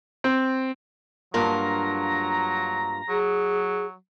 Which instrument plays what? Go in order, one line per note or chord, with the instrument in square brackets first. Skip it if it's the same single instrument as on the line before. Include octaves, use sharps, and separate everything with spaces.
[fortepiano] C4
[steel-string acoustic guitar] G2 A#3 F4 [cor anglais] F#3 [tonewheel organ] A#5
[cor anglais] F#3 [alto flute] G#4